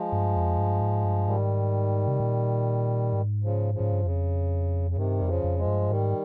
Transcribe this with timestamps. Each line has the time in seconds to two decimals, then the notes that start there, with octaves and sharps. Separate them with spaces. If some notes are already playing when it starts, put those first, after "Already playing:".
Already playing: F3 G#3
0.12 G2
0.36 F2
0.58 G2
0.81 G#2
1.04 G2
1.27 G#2 D#3 G3
2.08 C3
2.20 A#2
3.13 G#2
3.44 C#3 F3
3.74 C#3 F3
3.80 G#2
3.92 G2
4.05 F2 C#3
4.91 C#3
4.97 G2 C3 D#3
5.18 F2 G3
5.28 C#3 F3
5.44 F2
5.59 F3 G#3
5.67 G2
5.90 G#2 D#3 G3